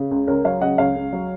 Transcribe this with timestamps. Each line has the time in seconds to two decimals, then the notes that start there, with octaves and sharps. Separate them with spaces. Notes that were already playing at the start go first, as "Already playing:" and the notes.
Already playing: C#3
0.11 C#2
0.27 C#2 A#4 C#5
0.45 F#3 C#5 F5
0.61 C#3 D#5 F#5
0.78 C#2 C#5 F5
0.96 C#2
1.13 F#3